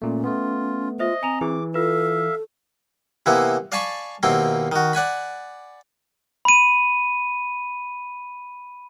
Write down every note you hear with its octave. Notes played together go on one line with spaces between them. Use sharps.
A#2 A3 C#4
A3 B3 F4
F4 C5 D#5 E5
C4 G#5 A#5 F7
E3 G#4 D6
F4 A4 B4 E5 F5
C3 E3 A#3 B3 E4
D5 F5 G#5 A5 B5 C#6
D#2 B2 A#3 C4 E4 G5
D#3 F#4
D5 F#5 G#5 B5
B5 D#7